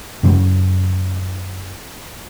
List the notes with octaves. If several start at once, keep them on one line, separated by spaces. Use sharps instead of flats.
F#2 C#3 F#3